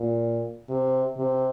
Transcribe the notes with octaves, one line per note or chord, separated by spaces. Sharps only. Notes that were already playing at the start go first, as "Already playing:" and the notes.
Already playing: A#2
C3
C3